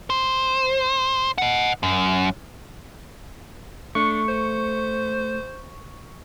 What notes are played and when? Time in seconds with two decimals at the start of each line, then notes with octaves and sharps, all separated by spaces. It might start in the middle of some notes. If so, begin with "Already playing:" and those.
0.10 C5
1.38 D#5 F#5
1.83 F#2
3.95 A3 D4 C#6
4.28 C5